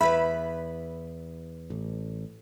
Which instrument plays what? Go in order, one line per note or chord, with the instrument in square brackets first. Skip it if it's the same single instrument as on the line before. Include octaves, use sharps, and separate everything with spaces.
[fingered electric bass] E2 [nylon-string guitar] B4 E5 [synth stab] B5
[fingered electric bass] A1